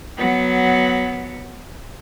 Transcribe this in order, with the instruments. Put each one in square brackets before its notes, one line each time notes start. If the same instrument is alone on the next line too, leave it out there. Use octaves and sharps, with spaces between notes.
[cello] F#3 B3